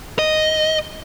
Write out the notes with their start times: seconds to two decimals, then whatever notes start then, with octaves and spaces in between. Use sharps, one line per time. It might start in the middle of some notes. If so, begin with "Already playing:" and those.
0.19 D#5